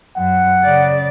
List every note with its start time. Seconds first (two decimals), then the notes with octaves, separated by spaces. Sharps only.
0.17 F#2 F#5
0.63 C#3 D5